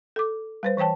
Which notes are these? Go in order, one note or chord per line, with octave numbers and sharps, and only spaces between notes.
A4 D6
G3 B4 C5
E3 C5 C#5 G5 A5